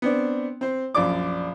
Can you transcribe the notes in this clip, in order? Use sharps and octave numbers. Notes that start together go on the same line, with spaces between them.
B3 C4 D4
C4 C5
A#1 F#2 D5 D6